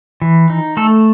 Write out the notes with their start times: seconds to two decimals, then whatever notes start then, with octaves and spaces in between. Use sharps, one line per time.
0.21 E3
0.50 D#4
0.77 A3 A4